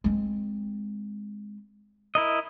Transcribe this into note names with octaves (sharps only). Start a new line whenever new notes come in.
G#3 C4
E4 A#4 D#5